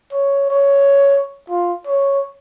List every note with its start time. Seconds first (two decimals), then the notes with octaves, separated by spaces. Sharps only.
0.12 C#5
0.50 C#5
1.49 F4
1.87 C#5